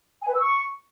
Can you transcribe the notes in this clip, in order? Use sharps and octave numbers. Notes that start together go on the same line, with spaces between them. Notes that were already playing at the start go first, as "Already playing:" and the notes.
G#5
B4
E6
C#6